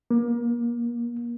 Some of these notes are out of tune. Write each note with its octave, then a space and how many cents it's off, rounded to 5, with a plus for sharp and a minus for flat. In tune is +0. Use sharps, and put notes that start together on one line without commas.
A#3 +30